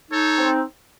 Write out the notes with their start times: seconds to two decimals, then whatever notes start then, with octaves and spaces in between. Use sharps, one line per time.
0.11 D#4 A4 C#5
0.38 C4